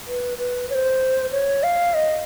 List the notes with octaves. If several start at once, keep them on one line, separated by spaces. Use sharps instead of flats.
B4
B4
C#5
C5
C#5
F5
D#5